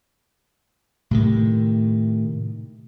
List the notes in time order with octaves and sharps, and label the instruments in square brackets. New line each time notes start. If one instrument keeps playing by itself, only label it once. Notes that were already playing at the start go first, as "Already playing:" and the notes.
[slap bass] A2 C3 D#3